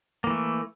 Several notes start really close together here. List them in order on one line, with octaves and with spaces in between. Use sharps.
A#3 E3 A3